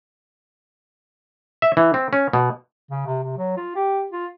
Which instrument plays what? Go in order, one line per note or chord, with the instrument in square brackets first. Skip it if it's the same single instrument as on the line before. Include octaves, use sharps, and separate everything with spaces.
[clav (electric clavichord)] E5
E3
C4
C#4
B2
[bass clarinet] C#3
C3
C3
F#3
F4
G4
F4